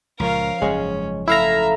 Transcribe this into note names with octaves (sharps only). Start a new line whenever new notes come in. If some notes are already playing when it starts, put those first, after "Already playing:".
C#2 A#2 F3 C#4 A#4 F5
F#1 G#2 G#3 C#4 C#5
A3 E4 E5 F5 A#5